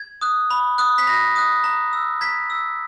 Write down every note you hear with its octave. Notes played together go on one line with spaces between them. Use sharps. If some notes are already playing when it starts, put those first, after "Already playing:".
Already playing: G#6
D#6 F#6
B5
D#6 F#6
B6
B5 A#6
D#6 F#6
A#5
E6
A#5 G#6 B6
E6